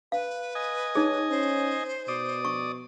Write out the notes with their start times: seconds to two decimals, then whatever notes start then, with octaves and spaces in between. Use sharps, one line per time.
0.12 B4 F5
0.55 D#5 G#5
0.95 D#4 G#4 C#5
1.29 C#4 C5
2.08 B2 D5 D#6
2.45 C#6